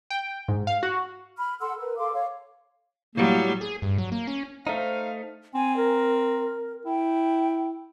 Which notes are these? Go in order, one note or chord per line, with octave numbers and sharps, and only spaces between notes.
G5
G#2
F5
F#4
B5 F6
A4 F#5 C6 E6
A#4 B4
A4 F5 C6 D6
C#5 F5
A2 F#3 G3 A#3
G#4
G2
F#3
A#3
C#4
A3 D#4 C5 F5
C4 G#5
A#4
E4 G5